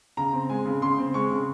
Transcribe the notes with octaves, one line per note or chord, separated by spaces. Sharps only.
C#3 A#5
C4
G#3 G#5
C#3
C#3 C6
C4
G#3 C#6
C#3